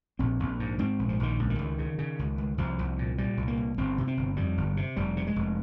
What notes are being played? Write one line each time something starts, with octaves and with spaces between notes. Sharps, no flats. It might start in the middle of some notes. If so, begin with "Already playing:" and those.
A#1 C4
A#1
G#2
G#2 C4
A#1
F3
A#1 D#3
C#2
D#3
C#2
C#3
C#3
C#2
C#2
C2 F3
C2
A#2
A#2 G3
C2
A#3
C2
G1 C4
C3
C4
G1
F2 G3
G1
C3
F1 G3
C3
G#3
F1